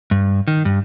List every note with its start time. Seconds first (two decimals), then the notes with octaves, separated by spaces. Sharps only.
0.11 G2
0.48 D#3
0.65 G2